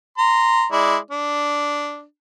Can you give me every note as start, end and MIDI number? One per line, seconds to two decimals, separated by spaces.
0.18 0.65 82
0.18 0.65 84
0.72 0.97 56
0.72 0.97 64
0.72 0.97 74
1.11 2.03 62